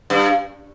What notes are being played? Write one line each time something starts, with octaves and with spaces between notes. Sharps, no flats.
G2